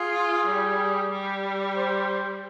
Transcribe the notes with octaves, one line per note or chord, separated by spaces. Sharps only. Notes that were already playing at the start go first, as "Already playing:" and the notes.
Already playing: F4 G#4
G3
G3
C5